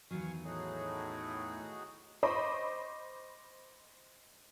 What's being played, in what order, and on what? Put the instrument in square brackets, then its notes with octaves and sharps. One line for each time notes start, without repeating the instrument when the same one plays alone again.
[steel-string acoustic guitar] E2 D#3 F#3 [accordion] F5 G#5 C#6
[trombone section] A2 [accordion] D#4 F#4 G#4
[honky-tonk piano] C5 D#5 B5 C#6 D6